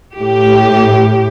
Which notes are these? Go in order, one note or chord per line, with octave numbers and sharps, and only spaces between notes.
A2 G4